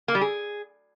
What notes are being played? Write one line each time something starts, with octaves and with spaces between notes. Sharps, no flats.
A#3
G3
G#4